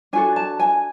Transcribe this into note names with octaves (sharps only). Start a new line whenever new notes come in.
D4 F#4 A4 G#5
A5
G#5